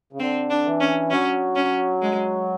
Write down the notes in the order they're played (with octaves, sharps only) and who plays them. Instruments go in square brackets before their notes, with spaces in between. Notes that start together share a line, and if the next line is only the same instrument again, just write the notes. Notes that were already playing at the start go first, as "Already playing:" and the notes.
[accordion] C#3
[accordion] D3 [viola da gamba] C4
[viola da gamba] D4
[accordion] E3
[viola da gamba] C#4
[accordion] F#3 [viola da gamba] C#4
[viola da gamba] C#4
G#3